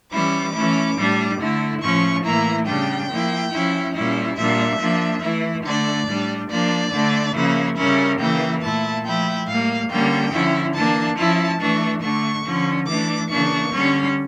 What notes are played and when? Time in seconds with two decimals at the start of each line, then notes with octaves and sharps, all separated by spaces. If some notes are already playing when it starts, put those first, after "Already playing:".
0.11 E3 G3 C#4 E4 D6
0.54 E3 A3 C#4 E4
0.96 A2 G3 D4
1.39 D3 A3 E4
1.81 A2 F3 A3 C#4 C#6
2.24 A2 E3 A#3 E4 A#5
2.66 C#3 G3 D4 G5
3.09 F3 A#3 E4
3.51 F3 C#4 E4
3.93 A#2 G3 C#4 E4
4.36 A#2 G3 D4 E5
4.79 F3 A#3 D4
5.21 E3 A3 E4
5.63 D3 A3 D4 D5
6.07 A2 G3 D4
6.49 F3 A#3 D4 D5
6.91 D3 A3 D4
7.34 C#3 F3 A#3 C#4 E4
7.76 C#3 G3 C#4 E4 A#4
8.19 C#3 E3 A#3 E4 G5
8.61 A#2 A3 E4 A5
9.03 F3 A3 E4 G5
9.46 A2 G3 A#3 F5
9.89 D3 G3 A#3 C#4 G5
10.31 D3 F3 C#4 E4
10.74 E3 A#3 D4 A5
11.16 F3 C#4 E4 A5
11.59 E3 A3 D4 C#6
12.01 D3 A3 D4 C#6
12.44 D3 F3 C#4
12.86 E3 A3 D4 D6
13.29 C#3 E3 A#3 D4 C#6
13.72 D3 G3 C#4